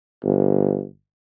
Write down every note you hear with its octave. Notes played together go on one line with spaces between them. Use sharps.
G1